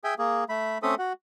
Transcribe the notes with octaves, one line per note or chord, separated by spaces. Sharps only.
G#4 E5 G5 G#5
A#3 G#4
A3 B5
A3 C4 C#4 A4 E5 D#6
F#4 F#5